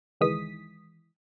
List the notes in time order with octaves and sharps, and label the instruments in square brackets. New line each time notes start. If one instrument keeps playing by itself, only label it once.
[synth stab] C#2 D#3 E3 G#3 D#6 B6